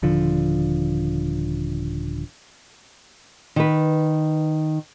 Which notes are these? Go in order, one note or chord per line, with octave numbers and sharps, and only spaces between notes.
D#1 D3 F3
D#3 B4